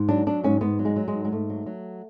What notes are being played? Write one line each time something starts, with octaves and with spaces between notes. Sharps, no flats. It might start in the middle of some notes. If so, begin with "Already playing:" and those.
Already playing: G#2
F#3 D4
F#3 D4
G#2 C#4
G#2 B3
F#3
G#3
F#3
G#3
G#2
G#3
G#2 A3
F#3
F#3